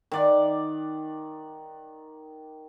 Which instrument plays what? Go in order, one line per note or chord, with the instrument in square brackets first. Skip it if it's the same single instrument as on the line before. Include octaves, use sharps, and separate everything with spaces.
[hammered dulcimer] D#3 D5 F#5